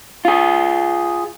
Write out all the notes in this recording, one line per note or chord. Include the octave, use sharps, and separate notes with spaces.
F4 G#4